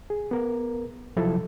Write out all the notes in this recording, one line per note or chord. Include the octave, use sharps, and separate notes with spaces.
G#4
B3 A#4
C2 F3 F#3 E4 A4 A5